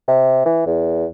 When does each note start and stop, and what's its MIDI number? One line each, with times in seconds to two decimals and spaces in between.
0.08 0.45 48
0.45 0.64 52
0.67 1.05 40